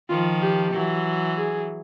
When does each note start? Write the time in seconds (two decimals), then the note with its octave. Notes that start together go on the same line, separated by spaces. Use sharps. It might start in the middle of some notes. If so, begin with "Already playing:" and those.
0.09 D#3 F3 F4
0.41 G4
0.74 E3 F#3
1.38 G#4